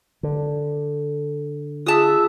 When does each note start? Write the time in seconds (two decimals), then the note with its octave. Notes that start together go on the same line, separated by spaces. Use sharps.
0.23 D3
1.86 F4 G#4 E5 A5 D#6